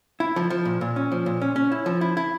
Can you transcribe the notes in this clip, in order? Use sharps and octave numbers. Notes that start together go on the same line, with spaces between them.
E4
F3
F3
A#2
A#2
C#4
F3
A#2
C#4
C#4
E4
F3
E4
E4